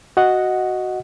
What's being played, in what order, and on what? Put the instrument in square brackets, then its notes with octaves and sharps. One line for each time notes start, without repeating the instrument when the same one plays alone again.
[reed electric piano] F#4 D#5 F#5